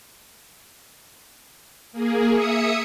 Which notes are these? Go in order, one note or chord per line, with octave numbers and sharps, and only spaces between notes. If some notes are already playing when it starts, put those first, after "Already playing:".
A#3 G#4
E5 D#6 C#7